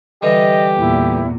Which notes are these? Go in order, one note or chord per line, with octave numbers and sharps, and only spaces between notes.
D3 E3 G3 G4 D#5
E2 A#2 E4